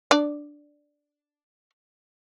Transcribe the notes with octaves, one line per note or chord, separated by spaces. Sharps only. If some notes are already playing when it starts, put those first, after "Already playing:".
D4 D5